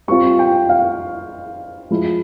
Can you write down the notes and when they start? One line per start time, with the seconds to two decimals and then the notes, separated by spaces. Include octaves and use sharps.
0.08 G3 C4 F4 C#6
0.39 G5
0.69 F5
1.91 F3 G#3 E4